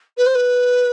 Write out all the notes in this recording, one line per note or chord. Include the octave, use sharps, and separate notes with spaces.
B4
C5
B4